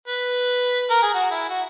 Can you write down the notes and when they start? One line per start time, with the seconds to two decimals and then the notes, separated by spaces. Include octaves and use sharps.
0.08 B4
0.90 A#4
1.02 G#4
1.14 F#4
1.31 E4
1.49 F#4